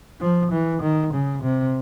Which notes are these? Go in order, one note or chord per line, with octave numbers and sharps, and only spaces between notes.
F3
E3
D#3
C#3
C3